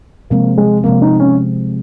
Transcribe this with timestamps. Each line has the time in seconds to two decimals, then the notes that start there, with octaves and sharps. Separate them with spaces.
0.30 C3 F3 G#3 A#3 C4
0.58 G#3
0.84 C3 F3 G#3 A#3 C4
1.02 D#4
1.20 C#4